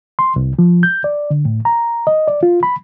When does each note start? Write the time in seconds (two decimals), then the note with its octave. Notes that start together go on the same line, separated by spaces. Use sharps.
0.19 C6
0.36 C2
0.59 F3
0.83 G6
1.04 D5
1.30 D3
1.45 A2
1.65 A#5
2.07 D#5
2.28 D5
2.43 F4
2.63 B5